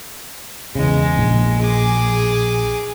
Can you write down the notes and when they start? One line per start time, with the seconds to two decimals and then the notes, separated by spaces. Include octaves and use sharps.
0.75 E2 C#3 G#3
1.17 A#1
1.61 G#4 D6